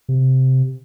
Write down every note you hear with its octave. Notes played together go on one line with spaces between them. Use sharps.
C3